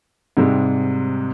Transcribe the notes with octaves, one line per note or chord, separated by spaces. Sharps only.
G#2 C3 G3 G#3